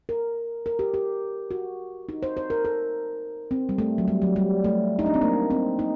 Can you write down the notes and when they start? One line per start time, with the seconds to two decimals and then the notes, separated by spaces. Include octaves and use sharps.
0.09 A#4
0.66 A#4
0.79 G4
0.94 G4
1.51 F#4
2.09 D#4
2.23 C5
2.37 C5
2.50 A#4
2.65 A4
3.51 C4
3.69 G3
3.78 A3
3.98 F#3
4.08 G3
4.22 F#3
4.36 G3
4.64 A3
4.99 D#4
5.06 D4
5.14 C4
5.22 A#3
5.50 C4
5.79 D#4